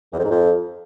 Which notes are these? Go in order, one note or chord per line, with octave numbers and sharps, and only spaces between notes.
E2
F2
G#2
F2